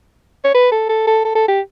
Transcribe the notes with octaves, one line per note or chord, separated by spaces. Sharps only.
C#5
B4
A4
A4
A4
A4
A4
G4